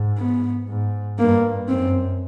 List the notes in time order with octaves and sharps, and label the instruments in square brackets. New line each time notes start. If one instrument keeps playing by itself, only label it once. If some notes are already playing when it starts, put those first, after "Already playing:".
Already playing: [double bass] G#2
[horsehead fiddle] B3
[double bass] G#2
[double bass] G2 [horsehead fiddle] A#3
[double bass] F#2 [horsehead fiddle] C4